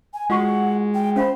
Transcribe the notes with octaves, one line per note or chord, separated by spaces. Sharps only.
G#5
G#3 F4 F#4 F#5 C#6
G5
C#4 C5 F5 B5